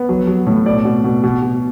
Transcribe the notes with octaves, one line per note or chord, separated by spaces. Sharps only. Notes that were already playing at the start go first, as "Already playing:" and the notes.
Already playing: B3
F#3
F#3
A2
B2 D5
B2
B2
B2
B2